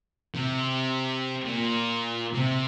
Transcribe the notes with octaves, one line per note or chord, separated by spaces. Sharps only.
C3
A#2
C3